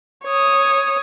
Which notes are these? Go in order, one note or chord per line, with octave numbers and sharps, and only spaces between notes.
C#5 D#6